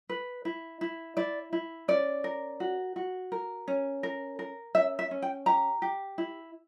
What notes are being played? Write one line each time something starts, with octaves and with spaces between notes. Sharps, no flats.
B4
E4
E4
E4 D5
E4
C#4 D5
A#4
F#4
F#4
A#4
C#4
A#4
A#4
C#4 E5
E5
C#4
G5
G4 A#5
G4
E4